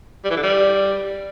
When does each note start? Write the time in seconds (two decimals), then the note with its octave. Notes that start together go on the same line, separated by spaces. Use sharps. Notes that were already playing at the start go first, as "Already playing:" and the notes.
0.24 G3
0.30 E3
0.37 D3
0.43 G3